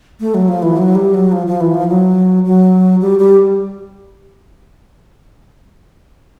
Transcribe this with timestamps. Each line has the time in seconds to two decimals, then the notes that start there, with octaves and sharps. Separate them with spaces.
0.20 A3
0.34 F#3
0.48 F3
0.62 E3
0.77 F#3
0.95 G3
1.14 F#3
1.32 F3
1.47 F3
1.61 E3
1.74 F3
1.88 F#3
2.45 F#3
3.01 G3
3.19 G3